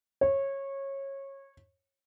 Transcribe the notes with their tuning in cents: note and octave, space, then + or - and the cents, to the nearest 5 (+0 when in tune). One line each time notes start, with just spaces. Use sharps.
C#5 -20